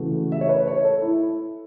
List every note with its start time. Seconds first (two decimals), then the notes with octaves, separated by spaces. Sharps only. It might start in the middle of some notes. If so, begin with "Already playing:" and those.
Already playing: C#3 E3 A3 F#4
0.32 E5
0.41 C#5
0.49 B4
0.67 C#5
0.84 A4
1.02 E4